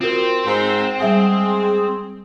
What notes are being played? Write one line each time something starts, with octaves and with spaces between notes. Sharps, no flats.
C4 F4 F#4 A#4
G#2 C5
G3 G#3 G#4 E5 F#5